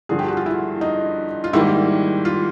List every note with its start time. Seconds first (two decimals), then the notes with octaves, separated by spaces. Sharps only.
0.09 G2 D3 F3 G#4
0.19 G4
0.28 F#4
0.37 F4
0.46 E4
0.81 D#4
1.44 F4
1.53 G#2 D#3 G3 A#3 E4
2.25 F4